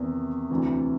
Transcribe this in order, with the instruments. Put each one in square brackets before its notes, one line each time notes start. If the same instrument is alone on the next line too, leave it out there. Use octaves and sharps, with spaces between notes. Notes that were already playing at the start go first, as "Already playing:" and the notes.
Already playing: [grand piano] E2 C3 D#3
D2 C3 E3